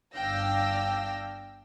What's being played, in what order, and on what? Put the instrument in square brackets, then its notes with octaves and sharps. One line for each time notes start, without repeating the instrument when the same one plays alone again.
[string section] G1 D4 F5 G5 E6 A#6